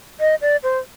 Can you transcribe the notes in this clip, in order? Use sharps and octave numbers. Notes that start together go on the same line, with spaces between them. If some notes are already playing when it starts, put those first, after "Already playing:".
D#5
D5
C5